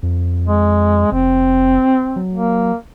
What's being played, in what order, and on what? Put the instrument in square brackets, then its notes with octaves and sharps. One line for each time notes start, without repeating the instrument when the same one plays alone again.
[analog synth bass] F2
[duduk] G#3
[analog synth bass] F1 [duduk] C4
[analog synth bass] F#3
[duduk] A#3